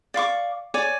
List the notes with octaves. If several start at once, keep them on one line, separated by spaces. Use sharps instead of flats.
D5 F5 C#6 D6
C#5 D5 G#5